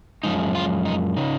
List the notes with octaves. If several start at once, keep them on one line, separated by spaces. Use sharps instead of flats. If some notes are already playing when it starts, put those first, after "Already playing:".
F#2 F3 G#3 D#4
F4
D#4
C#3 D#4